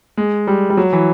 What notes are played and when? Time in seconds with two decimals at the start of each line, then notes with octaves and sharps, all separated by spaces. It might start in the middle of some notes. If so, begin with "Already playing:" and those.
0.17 G#3
0.47 G3
0.70 G3
0.77 F#3
0.93 E3